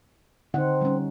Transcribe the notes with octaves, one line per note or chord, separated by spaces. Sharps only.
D3 C4 D#4 F#5
G3 C#4